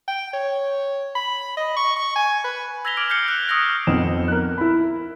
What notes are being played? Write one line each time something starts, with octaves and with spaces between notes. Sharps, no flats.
G5
C#5
B5
D#5
C#6
C#6
G#5
B4
E6 G#6 A#6 B6 F7 G7
D6 F6 G#6 D7 F#7
F6 G6 C7 C#7 G7
F#6 G6
C#6 D#6 E6 F#6 G6 A#6
F2 B3 C4 D#4 E7
A#4 F#6
E4 A#4 B5